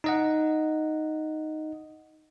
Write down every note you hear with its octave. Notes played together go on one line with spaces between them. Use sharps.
D#4 D#5 F#5